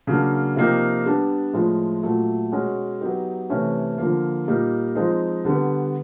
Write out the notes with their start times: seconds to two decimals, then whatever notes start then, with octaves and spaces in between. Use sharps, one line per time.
0.07 C#3 F#3 A#3 D4
0.56 C3 F3 A#3 D#4 G4
1.06 G3 B3 D4
1.53 A2 F3 G#3
2.03 A#2 F#3 A3
2.52 B2 G#3 C#4 F#4
3.01 F#3 B3 D#4 G4
3.50 C3 E3 A3 C#4
3.98 D3 F3 A#3
4.47 A#2 G3 A#3 D#4
4.95 F3 G#3 C4 D#4
5.45 D3 G3 B3